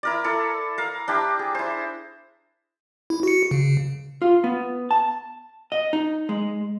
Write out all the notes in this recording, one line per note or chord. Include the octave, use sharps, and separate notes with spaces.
E4 A#4 D5
E4 A4
A#4 F5
D4 E4 G4
G#4
E4 C5
E4
F#4 C#7
C#3
F4
B3
A5
D#5
D#4
G#3